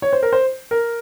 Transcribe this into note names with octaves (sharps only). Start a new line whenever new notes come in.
C#5
C5
A#4
C5
A#4